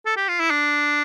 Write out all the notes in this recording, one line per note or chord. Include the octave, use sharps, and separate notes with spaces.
A4
G4
F4
E4
D4